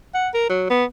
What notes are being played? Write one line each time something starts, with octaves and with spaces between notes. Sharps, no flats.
F#5
A#4
F#3
B3